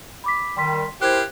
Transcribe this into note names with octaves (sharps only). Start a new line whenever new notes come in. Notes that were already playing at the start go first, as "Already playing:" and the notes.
B5 D6 B6
D#3 G3 G5 C6 B6
E4 G4 A#4 C5 F#6 G#6